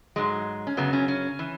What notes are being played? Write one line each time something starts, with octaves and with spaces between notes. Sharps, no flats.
G#2 F#3 G#3
C#4
F#2 C#3 F#3 B3
C#4
C#4
E3